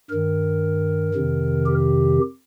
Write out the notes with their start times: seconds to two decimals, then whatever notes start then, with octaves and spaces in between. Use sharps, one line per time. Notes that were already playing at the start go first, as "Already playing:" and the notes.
0.10 G2 D#3 A#4
1.14 F2 C3 D#3
1.66 G4